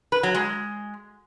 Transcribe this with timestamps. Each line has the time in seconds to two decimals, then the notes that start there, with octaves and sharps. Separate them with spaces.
0.12 B4
0.23 F#3
0.35 G#3